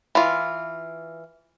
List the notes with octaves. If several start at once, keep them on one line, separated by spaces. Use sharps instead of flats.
E3 F4